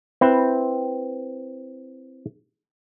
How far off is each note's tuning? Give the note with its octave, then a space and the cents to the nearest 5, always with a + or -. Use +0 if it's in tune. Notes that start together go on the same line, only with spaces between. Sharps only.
C4 +0 E4 +10 B4 +0